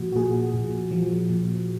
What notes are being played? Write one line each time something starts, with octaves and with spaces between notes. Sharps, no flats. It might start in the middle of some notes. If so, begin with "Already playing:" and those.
Already playing: A#2 F3 F#4
F#4
A#2 G#4
A#2
F3
A#2